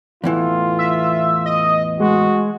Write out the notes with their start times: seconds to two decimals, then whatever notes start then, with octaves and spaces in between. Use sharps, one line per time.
0.24 E2 A2 E3 F4
0.79 E5
1.46 D#5
2.00 G#3 F#4